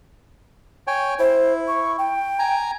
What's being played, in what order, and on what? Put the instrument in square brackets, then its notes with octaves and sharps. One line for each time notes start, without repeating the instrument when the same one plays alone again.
[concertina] C#5 G5 G#5
[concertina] E4 [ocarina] C5
[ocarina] C#6
G5
[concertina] G#5 A#5